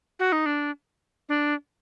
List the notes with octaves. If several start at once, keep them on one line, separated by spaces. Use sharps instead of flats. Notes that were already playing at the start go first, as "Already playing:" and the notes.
F#4
D#4
D4
D4